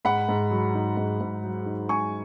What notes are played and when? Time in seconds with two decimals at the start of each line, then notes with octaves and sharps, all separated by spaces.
0.05 G#2 F#5 B5
0.29 G#2
0.51 F#3
0.74 D#4
0.97 G#2
1.20 G#2
1.44 F#3
1.66 D#4
1.89 G#2 G#5 C#6